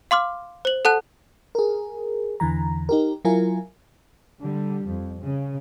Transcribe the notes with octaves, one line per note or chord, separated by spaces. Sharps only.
F5 C6 D6 F6
C5 F#7
A4 F#5 A5 F#6
G#4 A#4
E2 D3 E3 A#5
D#4 G4 A#4
F#3 E4 F4 A#4 G#5
D3 G3
F2
C#3